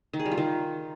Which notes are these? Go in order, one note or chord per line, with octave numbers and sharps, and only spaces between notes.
D#3
G#4
G3
F4
D#3